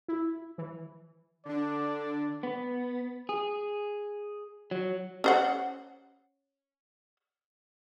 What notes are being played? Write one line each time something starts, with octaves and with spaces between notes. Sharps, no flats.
E4
E3
D3 D4 D5
B3
G#4
F#3
C#4 C5 F#5